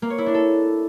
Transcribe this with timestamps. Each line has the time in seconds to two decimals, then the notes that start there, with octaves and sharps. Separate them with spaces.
0.02 A#3
0.10 C#5
0.18 E4
0.26 D4
0.34 A4